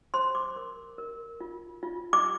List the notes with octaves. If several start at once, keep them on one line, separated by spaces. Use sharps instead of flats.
C5 C6
D6
A#4
A#4
F4
F4
D6